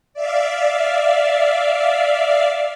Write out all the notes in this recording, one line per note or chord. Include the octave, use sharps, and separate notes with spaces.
D5 E5 F5